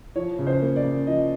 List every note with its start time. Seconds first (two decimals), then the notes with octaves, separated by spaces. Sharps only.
0.16 F3 C#5
0.39 C#3
0.47 C5
0.62 A#3
0.76 D5
0.84 C#3
1.07 F3 D#5